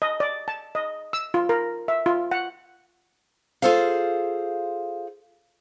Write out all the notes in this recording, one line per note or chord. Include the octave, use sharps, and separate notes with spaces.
D#5
D5
A5
D#5
E6
F4
A#4
E5
F4
F#5
F4 G#4 A4 C5 F5